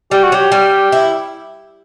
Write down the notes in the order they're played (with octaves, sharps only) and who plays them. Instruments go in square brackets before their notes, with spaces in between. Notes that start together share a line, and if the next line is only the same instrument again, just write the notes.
[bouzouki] G3 [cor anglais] G4
[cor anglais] F#4
[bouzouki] F#3 [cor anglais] G4
[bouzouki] G3
E4